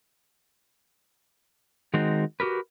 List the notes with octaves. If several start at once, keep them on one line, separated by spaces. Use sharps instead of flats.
D#3 G#3 C4 D#4 F#4
F#4 G4 A#4 B4